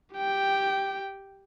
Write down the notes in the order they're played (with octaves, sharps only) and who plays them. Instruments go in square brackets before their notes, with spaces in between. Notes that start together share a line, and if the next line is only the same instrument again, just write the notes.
[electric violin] G4 G5